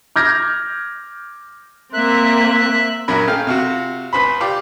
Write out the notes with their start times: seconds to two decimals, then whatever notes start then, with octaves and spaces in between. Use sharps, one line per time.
0.16 D6 F6 G6 G#6 A#6
1.94 A#3 C4 E5 F#6
3.08 A#1 F#3 C#4 A#4 B5
3.27 C#3 A3 F5 G5 F6
3.47 C3 F4 F#4
4.13 C#2 B4 C5 B5
4.41 F4 G4 D5 D6